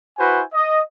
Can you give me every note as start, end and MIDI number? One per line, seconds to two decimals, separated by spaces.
0.18 0.42 64
0.18 0.42 66
0.18 0.42 71
0.18 0.42 72
0.18 0.42 80
0.54 0.81 75